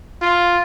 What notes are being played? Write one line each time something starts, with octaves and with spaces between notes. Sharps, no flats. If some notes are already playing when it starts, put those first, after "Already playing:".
F4